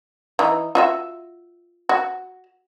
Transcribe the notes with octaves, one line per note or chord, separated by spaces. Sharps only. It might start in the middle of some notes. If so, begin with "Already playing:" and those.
E3 D#4
F4 F#4 E5
F#4